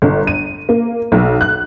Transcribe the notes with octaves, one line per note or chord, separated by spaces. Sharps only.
G1
D#7
A#3
B1
F#6